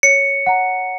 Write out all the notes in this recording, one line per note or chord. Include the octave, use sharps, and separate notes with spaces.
C#5 C#7
F#5 A#5